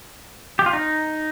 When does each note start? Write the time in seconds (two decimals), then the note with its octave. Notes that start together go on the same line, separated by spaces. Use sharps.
0.59 G4
0.66 F4
0.73 D#4